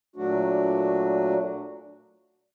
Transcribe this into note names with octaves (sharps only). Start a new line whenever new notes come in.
A#2 F#3 A3 D4 F#4